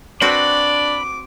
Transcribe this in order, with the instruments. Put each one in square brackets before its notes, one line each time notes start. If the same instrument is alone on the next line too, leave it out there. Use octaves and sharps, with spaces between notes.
[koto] C4 F#4 B4 [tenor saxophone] D4 [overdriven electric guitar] B5 [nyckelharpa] D6